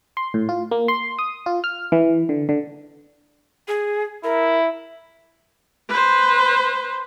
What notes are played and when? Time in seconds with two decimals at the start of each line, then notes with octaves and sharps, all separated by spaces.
0.17 C6
0.34 A2
0.49 F4
0.71 A#3
0.88 C6
1.19 D#6
1.46 F4
1.64 F6
1.92 E3
2.29 D3
2.49 D3
3.68 G#4
4.24 E4 A#4
5.89 B4 C5